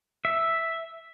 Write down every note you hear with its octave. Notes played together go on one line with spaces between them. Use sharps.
E5